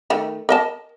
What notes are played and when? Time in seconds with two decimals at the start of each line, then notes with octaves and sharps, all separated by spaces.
0.10 D#3 A3
0.49 A#4 D#5 A5